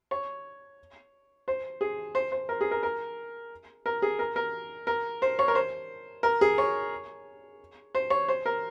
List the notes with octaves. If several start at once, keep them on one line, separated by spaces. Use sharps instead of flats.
C#5
C5
G#4
C5
C5
A#4
G#4
A#4
A#4
A#4
G#4
A#4
A#4
A#4
C5
C#5
A#4
C5
A#4
G#4
C#5
C5
C#5
C5
A#4